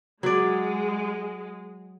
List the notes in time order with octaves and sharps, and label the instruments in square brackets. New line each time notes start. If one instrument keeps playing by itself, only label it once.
[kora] F#3 D5 [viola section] G#3